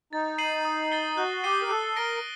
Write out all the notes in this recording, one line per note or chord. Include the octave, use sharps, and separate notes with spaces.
D#4 A6
C7 D#7 F#7
D#6
A6 C7 G7
F#4 F#6
G4 C7 D#7 G7
A#4
A4 F#6
A#4 A#6 D7 G7